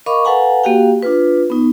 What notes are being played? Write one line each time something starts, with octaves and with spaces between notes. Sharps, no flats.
A#4 D#5 F5 B5 C#6 D6
A4 B4 F5 F#5 G#5 A#5
A#3 F#4 G4 F5 G5
D4 F4 B4
B3 D#4